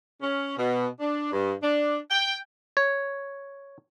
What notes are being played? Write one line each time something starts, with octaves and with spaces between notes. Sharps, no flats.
C#4
B2
D4
G2
D4
G5
C#5